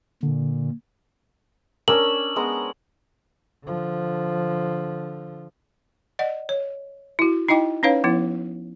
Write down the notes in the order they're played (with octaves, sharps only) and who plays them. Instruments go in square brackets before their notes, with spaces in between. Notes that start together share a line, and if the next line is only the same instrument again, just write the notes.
[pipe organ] A#2 [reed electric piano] D3
[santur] C#4 D4 E6 [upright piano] A#4 [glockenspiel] F#7
[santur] G#3 B3 A#5
[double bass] D3 F3
[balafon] D5 D#5 F#5
C#5
E4 F#4
D#4 E4 D#5 G5 D6
C#4 D#4 B4 C#5 F5
F3 B3 E4